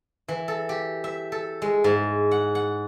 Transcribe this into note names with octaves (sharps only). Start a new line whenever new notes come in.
E3
A4
G4
E5
A4
G#3
G#2
F#5
F#5